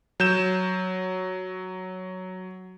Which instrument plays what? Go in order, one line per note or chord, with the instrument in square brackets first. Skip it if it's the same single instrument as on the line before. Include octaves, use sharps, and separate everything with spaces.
[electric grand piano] F#3 G6 E7